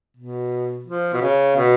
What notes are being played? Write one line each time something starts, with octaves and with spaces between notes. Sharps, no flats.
B2
F3
B2
C#3
B2